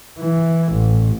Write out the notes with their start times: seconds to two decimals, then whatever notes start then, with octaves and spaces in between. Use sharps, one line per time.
0.20 E3
0.73 A1